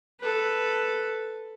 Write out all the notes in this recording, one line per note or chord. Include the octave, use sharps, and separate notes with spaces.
A4 B4